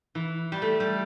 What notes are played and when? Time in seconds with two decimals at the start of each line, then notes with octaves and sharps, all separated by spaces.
0.15 E3
0.52 G3
0.62 A3
0.80 G3